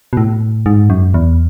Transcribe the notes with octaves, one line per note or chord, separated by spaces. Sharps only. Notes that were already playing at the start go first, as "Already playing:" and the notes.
B2
A2
G#2
F#2
E2